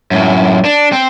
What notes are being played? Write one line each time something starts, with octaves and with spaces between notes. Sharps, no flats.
F#2 A2
D4
C4